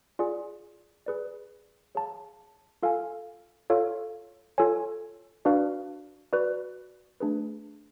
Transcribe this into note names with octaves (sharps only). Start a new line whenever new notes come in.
F4 G#4 D5 G#5
G#4 B4 D5
G#4 C#5 F5 A5
F4 A4 F5 G#5
F4 A4 C#5 F5
F4 A4 C#5 G#5
D4 F#4 B4 D5 F5
F#4 B4 D5
A3 D4 G#4 B4